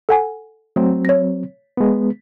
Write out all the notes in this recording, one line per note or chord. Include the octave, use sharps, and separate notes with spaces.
A4 F#5 G#5
F#3 A3 C4
C#5 A#6
G#3 B3